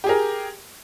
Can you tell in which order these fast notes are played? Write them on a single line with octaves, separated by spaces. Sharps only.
G4 G#4 A#4